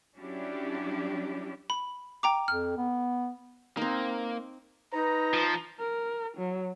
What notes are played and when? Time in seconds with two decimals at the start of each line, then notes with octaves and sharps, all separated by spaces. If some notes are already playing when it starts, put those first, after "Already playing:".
0.15 F#3 C#4 D4 E4 G4
1.70 B5
2.23 G5 A#5 D6
2.48 F2 F6
2.77 B3
3.77 A#3 C4 D#4
4.93 D#4 B4 A#5
5.34 F3
5.79 A#4
6.37 F#3